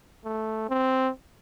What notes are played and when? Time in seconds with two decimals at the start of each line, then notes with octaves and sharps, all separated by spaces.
0.25 A3
0.69 C4